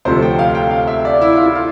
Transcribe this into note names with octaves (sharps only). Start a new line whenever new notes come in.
D2 C3 F3 A3 C5
G5
F5
G5
F5
E5
D5
E4
F4
E4
F4